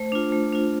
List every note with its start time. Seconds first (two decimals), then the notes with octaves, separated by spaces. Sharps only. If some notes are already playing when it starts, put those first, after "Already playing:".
Already playing: A3 C5
0.12 D4 F4
0.32 A3
0.53 D4 F4